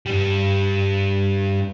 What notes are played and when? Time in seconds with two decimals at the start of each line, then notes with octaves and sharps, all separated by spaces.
0.06 G2 G3